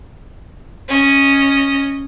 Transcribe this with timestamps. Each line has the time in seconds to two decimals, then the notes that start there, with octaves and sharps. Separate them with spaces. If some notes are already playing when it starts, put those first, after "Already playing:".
0.89 C#4 D#5